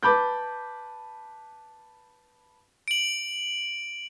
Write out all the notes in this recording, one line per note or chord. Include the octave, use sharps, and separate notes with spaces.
B4 A5 B5 D6 G6
D7 F#7